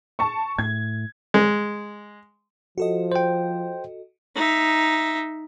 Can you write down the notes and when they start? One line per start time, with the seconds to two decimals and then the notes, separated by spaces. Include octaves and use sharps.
0.19 A5 C#6
0.58 A2 G#6
1.34 G#3
2.78 F3 F#4 A4 D#5
3.12 C5 G5
4.36 D#4 E5